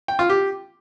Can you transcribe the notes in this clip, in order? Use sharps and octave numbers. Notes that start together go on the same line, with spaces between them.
G5
F4
G4